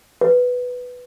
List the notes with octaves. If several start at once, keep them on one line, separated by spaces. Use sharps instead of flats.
B4